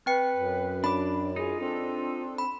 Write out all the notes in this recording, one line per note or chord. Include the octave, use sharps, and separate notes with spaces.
C4 B4 G5 C#7
F#2
D4 B5 D6
D#4 F4 G#4
C4 D4 A4
B5